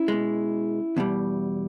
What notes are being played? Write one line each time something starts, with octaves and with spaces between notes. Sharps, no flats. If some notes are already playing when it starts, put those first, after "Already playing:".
Already playing: C#4 E4
B2 G#3
E2 B2 G3